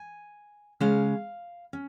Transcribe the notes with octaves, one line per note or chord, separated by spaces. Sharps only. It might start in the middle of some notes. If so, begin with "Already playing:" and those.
Already playing: G#5
C#3 G#3 C#4 F5
C#4